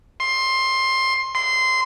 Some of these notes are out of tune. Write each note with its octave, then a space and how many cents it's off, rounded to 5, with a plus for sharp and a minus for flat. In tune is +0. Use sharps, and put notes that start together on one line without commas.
C6 +15
C6 -15